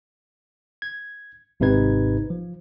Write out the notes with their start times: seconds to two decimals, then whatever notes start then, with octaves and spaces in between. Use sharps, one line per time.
0.82 G#6
1.60 G#1 G#2 C3 D#4 B4 G#6
2.30 F3